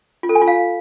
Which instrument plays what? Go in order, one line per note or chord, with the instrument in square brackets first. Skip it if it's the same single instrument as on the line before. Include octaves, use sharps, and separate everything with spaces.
[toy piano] F4
A4
G#5
F4
F5